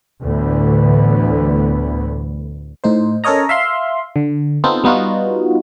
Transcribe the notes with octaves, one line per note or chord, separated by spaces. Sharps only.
D2 A2 D3 E3 B3
A2 D#4 C5
C#4 A4 A#4 C#5 D#5 A#5
E5 F5 C6
D3
B3 C4 D#4 F4 A4 C5
G3 B3 D#4 F4 F#4